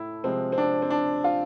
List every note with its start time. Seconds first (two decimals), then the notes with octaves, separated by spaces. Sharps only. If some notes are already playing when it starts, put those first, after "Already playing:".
Already playing: A2 E4
0.23 C3 F3 G#3 C4
0.52 C4
0.58 D4
0.82 C4
0.90 D4
1.24 F4